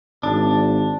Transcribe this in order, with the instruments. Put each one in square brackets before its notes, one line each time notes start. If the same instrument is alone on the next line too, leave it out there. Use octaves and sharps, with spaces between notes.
[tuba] G#1 [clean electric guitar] D4